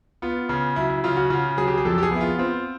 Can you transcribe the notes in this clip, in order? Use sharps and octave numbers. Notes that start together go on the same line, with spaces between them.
B3 F4
C#3
F#3 E4
E4
C#3 F4
F#4
C#3 F4
F#3 G#4
G4
G#4
F2 A4
G4
G#4
B3 E4
F4
C4 F4